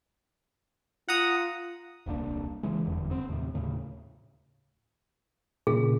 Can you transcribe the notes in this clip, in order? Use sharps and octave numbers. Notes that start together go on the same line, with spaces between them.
F4 F#5 A#5 D#6
D#1 C2 A#3 D4
C#3 E3 G#3
F1 E2 G2 D3
B3 C4
D#2 A2 C3 F3
D#2 A2 C#3
A#2 C#3 G#4